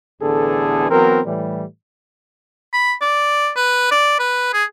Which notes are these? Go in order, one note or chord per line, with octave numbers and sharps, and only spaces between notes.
A1 D3 E3 B3 G#4 A4
E3 F#3 B3 C4 A#4
A2 E3 G3
B5
D5
B4
D5
B4
G#4